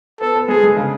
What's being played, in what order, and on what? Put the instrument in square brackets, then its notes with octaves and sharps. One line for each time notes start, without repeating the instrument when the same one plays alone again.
[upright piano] B3 [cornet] A4
[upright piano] B3
[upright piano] G#3 [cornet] G#4
[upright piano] G#3
C#3